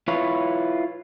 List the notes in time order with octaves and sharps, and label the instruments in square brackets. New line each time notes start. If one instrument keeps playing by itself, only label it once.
[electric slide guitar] E4 F4 B4 C#5